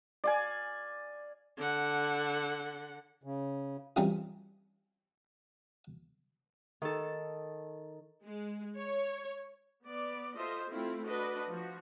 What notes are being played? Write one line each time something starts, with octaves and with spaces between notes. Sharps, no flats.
D5 F5 G#5
D3 F#5
C#3
E3 G3 C4 C#4 D#4 F4
D#3 A4
G#3
C#5
B3 D5
F4 A4 C5 D#5 E5
A3 C4 E4 F4
D4 F#4 B4 D#5
F3 F#4